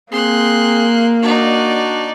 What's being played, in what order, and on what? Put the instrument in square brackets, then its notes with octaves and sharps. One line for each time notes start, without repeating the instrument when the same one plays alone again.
[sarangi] A#3 [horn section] C4 G#4 [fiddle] C6 F#6
[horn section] D4 F#4 [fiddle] D#4 D5